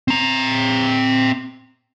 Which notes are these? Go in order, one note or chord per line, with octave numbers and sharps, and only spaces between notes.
C4 A#5